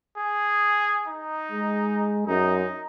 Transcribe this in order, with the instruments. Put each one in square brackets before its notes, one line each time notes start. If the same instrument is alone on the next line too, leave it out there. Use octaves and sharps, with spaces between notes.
[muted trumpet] G#4
D#4
[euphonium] G#3
[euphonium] F#2 [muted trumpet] D#4